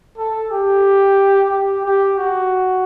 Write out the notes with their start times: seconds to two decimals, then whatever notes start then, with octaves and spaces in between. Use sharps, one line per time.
0.18 A4
0.51 G4
1.51 G4
1.85 G4
2.18 F#4